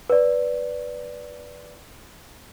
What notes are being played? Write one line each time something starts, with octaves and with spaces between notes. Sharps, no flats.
B4 D5